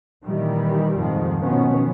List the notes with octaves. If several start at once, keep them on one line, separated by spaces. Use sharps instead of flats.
A#2 D#3 E3 G3
F2 G#2 D#3 F3
B2 D#3 F3 F#3 B3 C#4